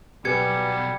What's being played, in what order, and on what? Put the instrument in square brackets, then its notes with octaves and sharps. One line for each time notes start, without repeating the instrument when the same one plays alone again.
[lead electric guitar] B1 B2 [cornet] G3 [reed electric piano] G4 B4 G#5 [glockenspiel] G#6 C#7